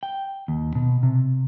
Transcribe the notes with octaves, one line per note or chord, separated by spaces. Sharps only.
G5
D#2
B2
C3